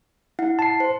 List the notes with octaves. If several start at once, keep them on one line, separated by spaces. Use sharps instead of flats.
E4 F#5
A5 C7
C5